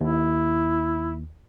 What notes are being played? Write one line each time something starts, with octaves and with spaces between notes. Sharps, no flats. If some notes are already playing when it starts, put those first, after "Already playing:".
D#2 E4